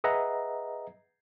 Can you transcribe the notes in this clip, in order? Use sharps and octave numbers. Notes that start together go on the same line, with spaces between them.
G#4 B4 D#5 E5 F#5 A#5